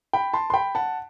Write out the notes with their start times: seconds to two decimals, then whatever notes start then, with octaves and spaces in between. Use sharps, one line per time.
0.13 G5 B5
0.33 A5 C6
0.50 C6
0.54 G5 B5
0.75 F#5 A5